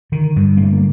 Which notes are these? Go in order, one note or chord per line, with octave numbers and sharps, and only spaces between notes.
D3 D#3
G2 G3
A#3
D3 A3
A#3